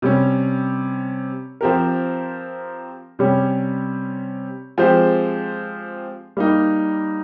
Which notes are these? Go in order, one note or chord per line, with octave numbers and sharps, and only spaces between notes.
C3 G3 C#4
F3 C4 G4 A#4
C3 G3 C#4 G4 C#5
F3 G#3 C4 G4 C5
G3 A#3 D#4